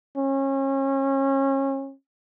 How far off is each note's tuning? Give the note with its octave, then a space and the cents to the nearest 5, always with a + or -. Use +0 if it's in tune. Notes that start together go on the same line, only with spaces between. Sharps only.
C#4 -30